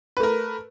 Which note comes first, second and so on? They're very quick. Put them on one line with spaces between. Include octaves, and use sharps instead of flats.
B4 A3 A#4